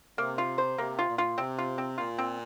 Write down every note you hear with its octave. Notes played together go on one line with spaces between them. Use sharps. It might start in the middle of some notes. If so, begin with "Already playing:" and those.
C3 A#3
F4
C5
C3 A#3
F4
A#2
F4
C3 C4
F4
C4
A#2 F4
C4